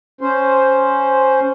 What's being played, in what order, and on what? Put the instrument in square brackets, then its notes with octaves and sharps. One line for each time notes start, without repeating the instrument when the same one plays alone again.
[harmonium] C#4 C5